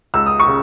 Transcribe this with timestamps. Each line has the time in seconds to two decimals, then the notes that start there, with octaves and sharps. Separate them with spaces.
0.14 C#2 E6
0.26 D#6
0.40 C#6
0.48 C#3